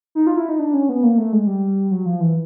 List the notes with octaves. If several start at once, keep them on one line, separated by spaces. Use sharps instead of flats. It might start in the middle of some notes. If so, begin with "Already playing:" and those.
D#4
F4
E4
D#4
D4
C#4
B3
A#3
A3
G#3
G3
F#3
F3
E3